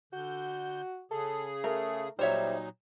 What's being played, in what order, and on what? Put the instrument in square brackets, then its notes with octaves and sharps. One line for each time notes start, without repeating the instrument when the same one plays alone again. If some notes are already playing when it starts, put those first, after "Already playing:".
[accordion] D3 G6 [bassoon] F#4
[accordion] C#3 G#4 [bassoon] A4
[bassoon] A3 [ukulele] A#4
[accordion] A#2 F#3 D#4 [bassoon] G3 [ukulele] C5 C#5 E5